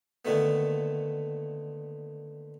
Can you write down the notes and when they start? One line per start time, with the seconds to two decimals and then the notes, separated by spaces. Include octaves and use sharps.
0.25 A#2 D3 D#3 A3 B3